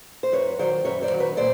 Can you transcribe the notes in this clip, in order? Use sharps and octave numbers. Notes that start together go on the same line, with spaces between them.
C5
F#2 B4 C#5
D#3 F#3 C5 D5
F#2 B4 C#5
C5 D5
D#3 F#3
B4 C#5
A#2 C5 D5